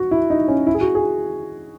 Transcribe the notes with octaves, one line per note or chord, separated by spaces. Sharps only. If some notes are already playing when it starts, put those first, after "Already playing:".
Already playing: F#4
E4
D#4
C#4
E4
G#4
F#4
G#4